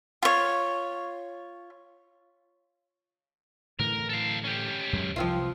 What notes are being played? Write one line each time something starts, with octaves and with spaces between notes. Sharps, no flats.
F4 C#5
A2 D3 E3 A#4
A4 F5
C#4 G4
F#2 F#3 G#3
C2 F3 C4 F4